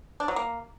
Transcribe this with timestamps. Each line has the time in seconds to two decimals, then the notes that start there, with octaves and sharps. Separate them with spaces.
0.20 D4
0.28 F#3
0.36 A#3